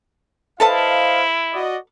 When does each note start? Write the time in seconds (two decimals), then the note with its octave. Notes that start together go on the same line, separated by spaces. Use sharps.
0.60 E4 A4 B4 C5 D#5 F5 A5
1.53 F#4 D5 D#5